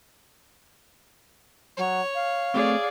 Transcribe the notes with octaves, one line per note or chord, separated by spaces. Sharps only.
F#3 C#5
F5
A3 C4 G#4 D5